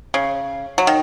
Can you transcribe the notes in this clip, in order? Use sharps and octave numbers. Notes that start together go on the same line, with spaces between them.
C#3
F#3
D#3